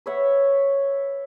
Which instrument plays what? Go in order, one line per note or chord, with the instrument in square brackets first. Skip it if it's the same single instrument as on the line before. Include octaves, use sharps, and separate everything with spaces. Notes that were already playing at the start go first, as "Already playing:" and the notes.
[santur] B4 C#5 E5 F#5